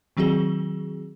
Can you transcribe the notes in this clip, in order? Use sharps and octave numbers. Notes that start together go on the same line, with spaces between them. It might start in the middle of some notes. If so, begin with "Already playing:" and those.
D#3 F#3 C4 F#4 G#4 G7